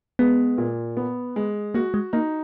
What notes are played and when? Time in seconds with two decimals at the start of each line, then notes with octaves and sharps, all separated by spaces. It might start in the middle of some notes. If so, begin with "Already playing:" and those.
0.19 G#3 B3
0.58 A#2
0.97 B3
1.36 G#3
1.74 A#3 F#4
1.94 G#3
2.13 A#3 D#4